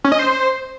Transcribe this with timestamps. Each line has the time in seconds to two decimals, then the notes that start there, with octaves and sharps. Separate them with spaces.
0.04 C#4
0.12 D#5
0.19 C5